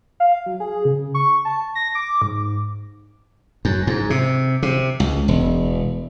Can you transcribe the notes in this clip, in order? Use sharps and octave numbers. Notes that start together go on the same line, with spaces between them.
F5
F#3
G#4
C#3
C#6
A5
A#6
D6
G#2
F#2
G#2
C3
C3
C#2
E1